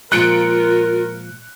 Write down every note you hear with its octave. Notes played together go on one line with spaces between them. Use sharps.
A#2 F3 G#3 F4 A#4 F#6 C#7 D7